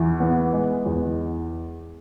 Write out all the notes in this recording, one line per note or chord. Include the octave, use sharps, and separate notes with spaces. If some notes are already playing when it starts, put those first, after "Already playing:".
Already playing: E2 E3
B3
G#3
E2